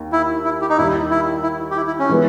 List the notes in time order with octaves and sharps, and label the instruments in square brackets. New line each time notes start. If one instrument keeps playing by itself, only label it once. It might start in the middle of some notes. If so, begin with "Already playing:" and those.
Already playing: [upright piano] D#2 D#3 A#3
[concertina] E4
E4
G4
D#4
[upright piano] D#2 D#3 G3 [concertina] E4
[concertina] E4
E4
G4
E4
E4
C#4
[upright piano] E3 G#3 B3 E4